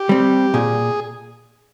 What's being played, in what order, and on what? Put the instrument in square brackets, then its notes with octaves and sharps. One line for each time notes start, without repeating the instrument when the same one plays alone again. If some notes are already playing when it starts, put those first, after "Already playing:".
Already playing: [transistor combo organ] G4
[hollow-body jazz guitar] G3 C4
[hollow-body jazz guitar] A#2 [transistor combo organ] G#4